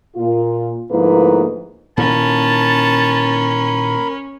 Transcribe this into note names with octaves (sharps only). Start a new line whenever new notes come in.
A#2 F4
D2 G#2 F3 A#3 E4 B4
A#2 D#3 E3 C#4 A#4 A5 B5